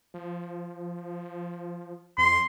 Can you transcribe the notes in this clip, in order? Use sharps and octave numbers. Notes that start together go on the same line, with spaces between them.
F3
F2 C6